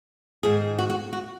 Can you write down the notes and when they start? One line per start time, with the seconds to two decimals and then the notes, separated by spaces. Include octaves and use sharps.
0.43 G#2 D#3 G#4
0.79 F#4
0.90 F#4
1.13 F#4